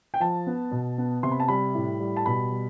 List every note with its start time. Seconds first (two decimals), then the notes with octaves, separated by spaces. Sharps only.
0.14 G5
0.20 F3 A5
0.47 B3
0.71 B2
0.98 B3
1.23 C3 C6
1.32 B5
1.40 A5
1.48 G3 B5
1.75 A2
2.00 G3
2.16 A5
2.26 B2 B5
2.52 G3